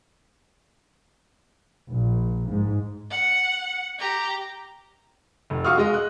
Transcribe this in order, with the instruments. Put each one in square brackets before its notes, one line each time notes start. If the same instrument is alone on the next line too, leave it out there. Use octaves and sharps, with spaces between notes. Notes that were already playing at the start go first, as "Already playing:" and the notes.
[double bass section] A#1
G#2
[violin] F#5
G4 A#5
[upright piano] F1
F#4 F5 C#6 D#6 F6
G#3 D#5
F#6